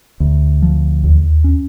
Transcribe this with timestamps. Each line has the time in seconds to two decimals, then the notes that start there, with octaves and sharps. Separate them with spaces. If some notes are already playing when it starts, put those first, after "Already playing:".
0.20 D2
0.62 F3
1.04 D#2
1.44 C#4